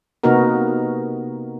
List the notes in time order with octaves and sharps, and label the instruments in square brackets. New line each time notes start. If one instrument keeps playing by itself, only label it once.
[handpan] C3 A#3 B3 D#4 F#4 A#4